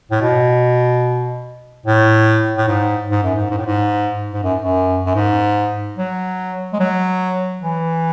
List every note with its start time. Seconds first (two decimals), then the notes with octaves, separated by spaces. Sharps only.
0.11 A2
0.21 B2
1.86 A2
2.57 A2
2.68 G#2
3.10 G#2
3.23 F#2
3.36 G#2
3.50 G#2
3.58 A2
3.65 G#2
4.33 G#2
4.43 F#2
4.62 F#2
5.06 F#2
5.15 G#2
5.97 F#3
6.73 G#3
6.79 F#3
7.62 E3